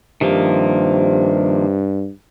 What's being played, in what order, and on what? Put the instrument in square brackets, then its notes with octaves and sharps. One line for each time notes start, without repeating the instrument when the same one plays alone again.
[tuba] G2 [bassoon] C3 [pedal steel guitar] D#3 F3 A#3